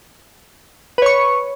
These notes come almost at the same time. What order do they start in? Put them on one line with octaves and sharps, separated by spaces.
B4 C#5 C#6